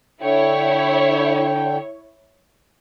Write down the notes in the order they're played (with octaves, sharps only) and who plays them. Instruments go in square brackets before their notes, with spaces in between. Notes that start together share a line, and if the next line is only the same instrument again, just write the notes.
[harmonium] D3 G5 [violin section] E4 C#5